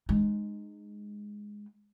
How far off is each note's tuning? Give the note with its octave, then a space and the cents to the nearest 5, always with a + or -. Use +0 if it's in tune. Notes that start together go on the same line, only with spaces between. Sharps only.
G#3 +0 D#4 -30